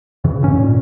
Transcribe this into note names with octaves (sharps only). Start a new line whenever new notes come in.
F2 C#3 E3
A1 G#2 C#4
A#2